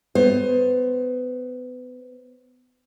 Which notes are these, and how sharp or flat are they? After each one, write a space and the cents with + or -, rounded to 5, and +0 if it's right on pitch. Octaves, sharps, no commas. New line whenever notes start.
B3 +30 C5 +30